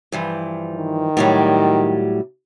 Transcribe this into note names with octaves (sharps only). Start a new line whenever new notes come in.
G2 E3 F3
D#3
A2 F#3 G3